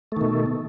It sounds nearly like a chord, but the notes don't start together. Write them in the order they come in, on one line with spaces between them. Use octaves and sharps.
A3 D#3 B2